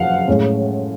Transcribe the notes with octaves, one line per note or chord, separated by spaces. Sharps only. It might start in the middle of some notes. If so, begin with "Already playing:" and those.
Already playing: F#2 F3 F5 F#5
A2 G#3 C#4